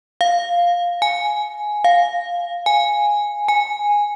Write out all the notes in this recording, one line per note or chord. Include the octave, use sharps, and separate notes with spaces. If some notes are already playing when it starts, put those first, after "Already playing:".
F5
G#5
F5
G#5
G#5